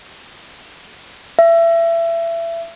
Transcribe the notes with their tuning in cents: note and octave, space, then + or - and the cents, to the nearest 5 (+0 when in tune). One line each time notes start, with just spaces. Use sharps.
E5 +25